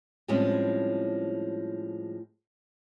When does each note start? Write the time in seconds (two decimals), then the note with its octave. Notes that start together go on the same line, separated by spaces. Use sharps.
0.28 A2 F3 G3 G#3 C4 C#4